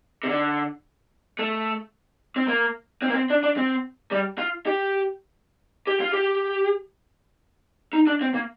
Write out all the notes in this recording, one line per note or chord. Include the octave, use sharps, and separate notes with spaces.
C3
D3
A3
C4
A#3
C4
A#3
C4
D4
D4
C4
G3
F4
G4
G4
F4
G4
D#4
D4
C4
A#3